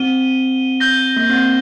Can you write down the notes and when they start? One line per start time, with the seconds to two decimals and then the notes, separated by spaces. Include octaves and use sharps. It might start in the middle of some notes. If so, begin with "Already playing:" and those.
Already playing: C4 D#7 G7
0.80 G6 A#6 G7
1.16 A#3
1.29 C4